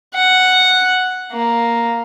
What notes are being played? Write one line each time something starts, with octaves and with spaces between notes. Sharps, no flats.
F#5
A#3